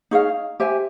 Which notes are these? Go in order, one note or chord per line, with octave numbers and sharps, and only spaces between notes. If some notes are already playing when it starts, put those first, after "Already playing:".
D#4 G#4 C#5 F5
G4 C5 E5 G#5